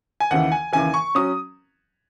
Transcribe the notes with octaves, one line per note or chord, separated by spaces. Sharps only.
G#5
D#2 C#3 E3 F#5
G#5
D#2 C#3 E3 G#5
C#6
F#3 C#4 D#6